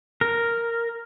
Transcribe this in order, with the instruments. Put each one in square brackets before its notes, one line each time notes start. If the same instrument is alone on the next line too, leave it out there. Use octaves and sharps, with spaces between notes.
[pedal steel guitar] A#4